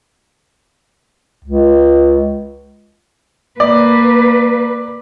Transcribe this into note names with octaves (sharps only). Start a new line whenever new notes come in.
C#2
A#3 B4 D5